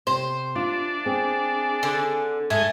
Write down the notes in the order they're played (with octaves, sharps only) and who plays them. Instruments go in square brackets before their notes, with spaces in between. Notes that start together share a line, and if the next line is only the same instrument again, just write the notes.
[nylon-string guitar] C3 [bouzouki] C5
[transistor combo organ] D4 [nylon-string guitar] F4
[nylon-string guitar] C4 [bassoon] G#4
[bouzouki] D3
[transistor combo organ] G#2 G#5 [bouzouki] A3